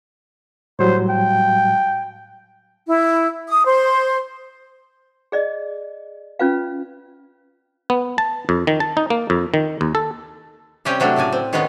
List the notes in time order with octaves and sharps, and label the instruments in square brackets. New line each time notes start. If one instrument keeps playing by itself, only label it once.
[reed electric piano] A2 F#3 G3 [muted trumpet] C5
[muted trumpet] G5
[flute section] E4
D#6
C5
[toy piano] G#4 D5 D#5
C#4 F4 B4 F5
[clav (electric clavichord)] B3
A5
F2
D#3
A5
D#4
A#3
F2
D#3
D#2
A4
[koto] C3 G3 C4 C#4 G5 G#5
C3 F#3 A3 D4
A2 C#3 D5 G#5
C4
D#3 G#3 B3 C#4 D#4 F4